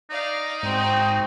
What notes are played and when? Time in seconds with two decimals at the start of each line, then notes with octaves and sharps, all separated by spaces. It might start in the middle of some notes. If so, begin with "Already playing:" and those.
0.10 D#4 D5 F5
0.63 G#2 C4 F#4